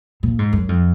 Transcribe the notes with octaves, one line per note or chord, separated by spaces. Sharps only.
A#2
G#2
F#2
F2